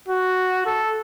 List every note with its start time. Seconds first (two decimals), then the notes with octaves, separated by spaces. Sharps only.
0.09 F#4
0.66 A4